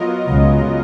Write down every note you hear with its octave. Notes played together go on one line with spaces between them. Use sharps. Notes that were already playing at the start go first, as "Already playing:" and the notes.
Already playing: F#3 B3 F4 A#4 D#5
C#2 C#3